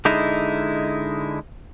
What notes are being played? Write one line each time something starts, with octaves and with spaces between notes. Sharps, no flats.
D3 G#3 D#4 E4